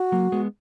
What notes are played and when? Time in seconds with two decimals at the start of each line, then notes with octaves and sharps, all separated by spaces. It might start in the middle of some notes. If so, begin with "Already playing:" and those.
Already playing: F#4
0.12 F#3 A#3
0.32 G#3 B3